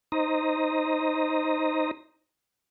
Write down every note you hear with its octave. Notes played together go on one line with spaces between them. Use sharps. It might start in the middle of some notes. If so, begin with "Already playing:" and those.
D#4 C5 D#5 A#5